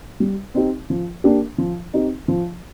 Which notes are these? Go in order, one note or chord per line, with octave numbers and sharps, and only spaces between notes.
G3
C4 D#4 G4
F3
A#3 D4 G4
F3
C4 D#4 G4
F3